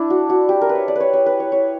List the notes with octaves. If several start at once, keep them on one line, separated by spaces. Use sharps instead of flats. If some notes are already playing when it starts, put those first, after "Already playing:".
Already playing: D4 E4
F#4
F#4
G4
A#4
B4
C#5
D5
B4 C#5
C#5
B4
C#5
C#5